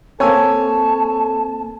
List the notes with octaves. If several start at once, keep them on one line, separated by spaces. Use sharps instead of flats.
A#3 C4 A4 C#5 G#5 A5 E6